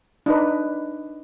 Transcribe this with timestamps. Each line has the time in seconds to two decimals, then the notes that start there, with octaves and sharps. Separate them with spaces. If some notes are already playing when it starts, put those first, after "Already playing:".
0.26 D4 D#4 B4